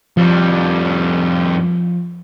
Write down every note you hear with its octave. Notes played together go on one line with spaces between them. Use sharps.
F2 F3 G3